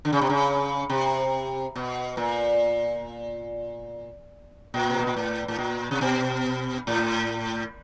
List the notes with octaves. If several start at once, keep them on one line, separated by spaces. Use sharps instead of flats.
D3
C#3
C3
C#3
C3
B2
A#2
A#2
C3
B2
A#2
A2
A2
A#2
C3
B2
A2